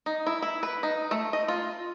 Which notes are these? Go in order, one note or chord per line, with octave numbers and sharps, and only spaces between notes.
D#4
E4
E4
B4
D#4
A3
D#5
F4